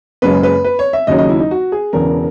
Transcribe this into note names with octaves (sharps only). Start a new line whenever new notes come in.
F#1 F#2 C#3 G#3 B4
B4
B4
C#5
E5
D#2 C#3 F#3 D#5
D#5
E4
D#4
F#4
G#4
E1 E2 C#3 A#4